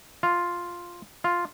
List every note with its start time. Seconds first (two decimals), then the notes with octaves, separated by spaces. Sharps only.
0.23 F4
1.24 F4